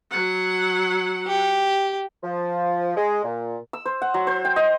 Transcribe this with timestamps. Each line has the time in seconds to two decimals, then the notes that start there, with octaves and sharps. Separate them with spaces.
0.11 F#3 F#5
1.27 G4
2.23 F3
2.96 G#3
3.23 A#2
3.73 E6
3.86 C5
4.02 F#5
4.14 F#3
4.27 C5
4.45 G5
4.56 D#5